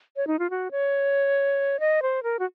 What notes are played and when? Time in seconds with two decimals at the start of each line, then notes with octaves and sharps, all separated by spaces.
0.16 C#5
0.27 D#4
0.39 F4
0.50 F#4
0.71 C#5
1.80 D#5
2.02 C5
2.23 A#4
2.39 F#4